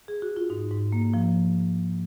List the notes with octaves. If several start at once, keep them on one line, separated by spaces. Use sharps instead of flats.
G#4
F#4
F4
G#2 D#4
G#2
A#3
F3